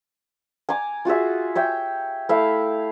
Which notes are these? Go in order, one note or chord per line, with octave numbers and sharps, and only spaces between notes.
G#5 A#5 D6
F4 F#4 G#4 E5
C#5 E5 G5
A3 E4 E5 F5